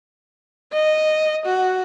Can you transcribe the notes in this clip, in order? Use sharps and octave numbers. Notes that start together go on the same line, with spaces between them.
D#5
F#4